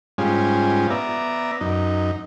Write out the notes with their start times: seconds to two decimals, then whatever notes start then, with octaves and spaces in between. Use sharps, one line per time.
0.18 G#2 G3 C#4 F4 G#4
0.90 B3 D5 E5 A#5
1.61 F#2 D#4